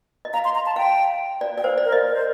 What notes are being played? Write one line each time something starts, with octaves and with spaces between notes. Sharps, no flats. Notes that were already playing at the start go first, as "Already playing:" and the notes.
D#5
F5 A#5
C6
A#5
A5
F5 G5
D5
D5 G5
C5 F5
D5
A#4
D#5
A#4
C5